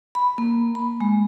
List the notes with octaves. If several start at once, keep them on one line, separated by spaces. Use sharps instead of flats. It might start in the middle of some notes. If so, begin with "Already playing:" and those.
B5
A#3
B5
G#3